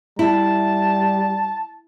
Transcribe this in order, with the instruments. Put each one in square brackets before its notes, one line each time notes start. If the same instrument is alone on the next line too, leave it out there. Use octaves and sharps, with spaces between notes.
[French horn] G3 [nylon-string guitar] E4 [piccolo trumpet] A5